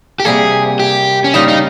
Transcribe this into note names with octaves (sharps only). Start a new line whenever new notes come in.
G4
C3 G3 A#3 G#4
G4
C#4
C#3 G3 A#3 D#4 F4
D#4